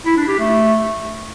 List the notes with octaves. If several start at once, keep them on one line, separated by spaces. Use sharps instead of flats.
E4
D4
G4
A3